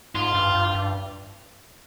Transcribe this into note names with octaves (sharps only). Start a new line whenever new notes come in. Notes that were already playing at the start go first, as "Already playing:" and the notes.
G#2 F4
G2
G2
G2